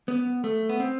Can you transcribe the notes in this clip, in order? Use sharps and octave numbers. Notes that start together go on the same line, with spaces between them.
B3
A3
B3
C4